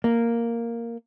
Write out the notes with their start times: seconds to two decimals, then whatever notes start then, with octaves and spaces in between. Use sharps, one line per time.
0.04 A#3